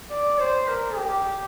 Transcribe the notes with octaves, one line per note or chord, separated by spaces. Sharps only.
D5
C5
A#4
G4